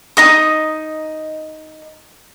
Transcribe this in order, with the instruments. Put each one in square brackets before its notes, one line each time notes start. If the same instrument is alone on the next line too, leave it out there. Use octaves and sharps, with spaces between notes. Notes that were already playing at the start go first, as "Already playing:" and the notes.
[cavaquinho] D#4 D#5 D#6